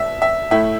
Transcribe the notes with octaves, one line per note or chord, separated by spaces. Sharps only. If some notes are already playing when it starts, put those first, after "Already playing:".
Already playing: B2 D4 E5
E5
A2 A3 E4 E5